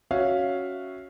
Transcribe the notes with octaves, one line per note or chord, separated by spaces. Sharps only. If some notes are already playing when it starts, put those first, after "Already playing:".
C#4 F#4 E5 F5